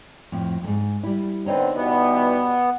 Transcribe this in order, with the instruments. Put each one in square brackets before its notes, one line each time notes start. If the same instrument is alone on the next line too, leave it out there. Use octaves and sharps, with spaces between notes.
[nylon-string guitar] F2 A2
F2 G#2
G3 E4
[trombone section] D3 B3 C4 [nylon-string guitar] D#4 C#5 D#5
[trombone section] B2 E3 G3 [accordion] B3